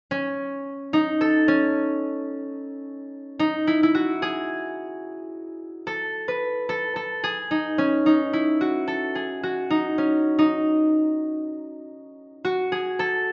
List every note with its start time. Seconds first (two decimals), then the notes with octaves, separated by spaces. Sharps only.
0.11 C#4
0.93 D#4
1.21 A4
1.48 C#4
3.39 D#4
3.67 E4
3.83 E4
3.95 F#4
4.22 G#4
5.87 A4
6.28 B4
6.69 A4
6.96 A4
7.24 G#4
7.51 D#4
7.78 C#4
8.06 D#4
8.33 E4
8.61 F#4
8.88 A4
9.15 G#4
9.43 F#4
9.70 D#4
9.98 C#4
10.39 D#4
12.45 F#4
12.72 G#4
12.99 A4